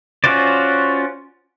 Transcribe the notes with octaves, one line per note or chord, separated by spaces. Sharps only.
C#4 F4 F#4 C5 D5